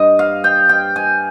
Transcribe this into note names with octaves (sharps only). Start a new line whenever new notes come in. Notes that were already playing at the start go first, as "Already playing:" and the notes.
Already playing: G2 D#5
F5
G5
G5
G#5